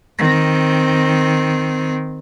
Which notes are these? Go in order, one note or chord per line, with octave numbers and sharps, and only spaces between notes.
D#3 C4